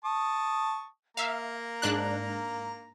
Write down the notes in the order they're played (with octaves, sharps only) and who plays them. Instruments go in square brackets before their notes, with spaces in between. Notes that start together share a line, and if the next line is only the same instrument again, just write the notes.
[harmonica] A5 C#6 D#6
[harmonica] A#3 A#5 [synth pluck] E5 F5
[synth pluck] G#2 D4 F#6